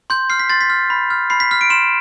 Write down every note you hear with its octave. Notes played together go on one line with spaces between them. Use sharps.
C6 G6
F6 C7
B6
C6 A6
B6
F6
B5
F6
B5 C7
B6
F6 B6
D7
C6 E7